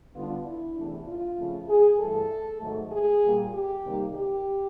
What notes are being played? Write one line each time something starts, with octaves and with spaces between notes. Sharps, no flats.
D3 G3 B3 D4 F4
E4
E2 C3 E3 A3 D4
F4
C#3 F3 A3 C4
G#4
G2 E3 A3 A4
G#2 D#3 F#3 A3
G#4
A#2 G3 A#3
G4
C3 D#3 G3 A#3 D#4
G4